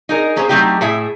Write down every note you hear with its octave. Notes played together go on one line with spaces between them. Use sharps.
D#4 G#4 A#4
A#3 C#4 G#4 B4 C5
F#3 A3 C4 D#4 G4
A2 E4 G#4 E5